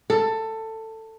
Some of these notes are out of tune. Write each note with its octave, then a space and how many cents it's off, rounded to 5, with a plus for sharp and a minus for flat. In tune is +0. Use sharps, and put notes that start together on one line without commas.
A4 +15